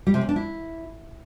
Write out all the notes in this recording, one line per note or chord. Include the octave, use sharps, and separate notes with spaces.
G3
C3
C#4
D4
E4